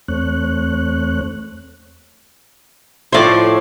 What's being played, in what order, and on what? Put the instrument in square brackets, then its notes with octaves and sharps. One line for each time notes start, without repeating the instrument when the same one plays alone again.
[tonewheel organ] E2 A3 C4 C#5 F#6
[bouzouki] A2 C5 [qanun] F3 D5 E5